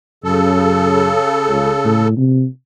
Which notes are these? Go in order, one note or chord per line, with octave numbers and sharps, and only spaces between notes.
F#2 C#3 A4
C#2
A2
C3